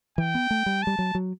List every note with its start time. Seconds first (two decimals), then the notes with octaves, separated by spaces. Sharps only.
0.18 E3 G5
0.35 B3
0.51 A3
0.66 G3
0.83 G3 A5
0.99 F#3
1.15 F#3